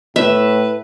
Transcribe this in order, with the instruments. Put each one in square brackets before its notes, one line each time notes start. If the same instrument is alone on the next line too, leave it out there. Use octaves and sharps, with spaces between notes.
[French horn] A2 [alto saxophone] B4 [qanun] E5